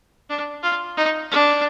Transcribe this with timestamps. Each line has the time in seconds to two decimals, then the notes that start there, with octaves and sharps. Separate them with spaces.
0.30 D4
0.63 F4
0.97 D#4
1.31 D4